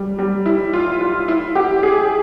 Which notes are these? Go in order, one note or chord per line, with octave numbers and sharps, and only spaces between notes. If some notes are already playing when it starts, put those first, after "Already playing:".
Already playing: G3
G3
E4
F4
F4
E4
G4
G#4